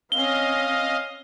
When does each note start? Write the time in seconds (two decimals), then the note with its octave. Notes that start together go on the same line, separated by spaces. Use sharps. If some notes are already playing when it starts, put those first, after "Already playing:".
0.12 C4 C#4 D#5 F5 G7